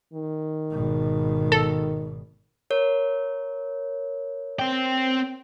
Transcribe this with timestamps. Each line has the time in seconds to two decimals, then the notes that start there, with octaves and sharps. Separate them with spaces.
0.13 D#3
0.70 G#1 B2
1.52 A4
2.70 A#4 C#5
4.59 C4 G5